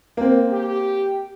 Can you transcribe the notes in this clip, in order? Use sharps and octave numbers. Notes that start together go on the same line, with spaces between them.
A#3 C4
G4